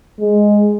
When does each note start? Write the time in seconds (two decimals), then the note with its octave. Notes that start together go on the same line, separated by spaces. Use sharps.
0.20 G#3